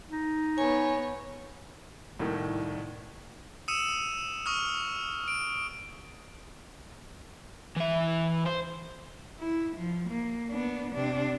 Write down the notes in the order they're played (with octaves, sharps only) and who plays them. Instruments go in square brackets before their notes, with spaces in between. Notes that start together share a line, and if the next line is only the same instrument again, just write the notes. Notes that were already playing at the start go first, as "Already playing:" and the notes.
[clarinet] D#4
[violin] B3 C#5 [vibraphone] G#5
[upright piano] C2 A2 D#3
[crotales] D#6 E6 C#7 D#7 E7
C#6 D#6 F6
D7
[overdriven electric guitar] E3 E5
C5
[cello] E4
F3
A#3
B3 D4
C3 D4